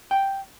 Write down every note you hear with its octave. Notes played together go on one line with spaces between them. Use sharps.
G5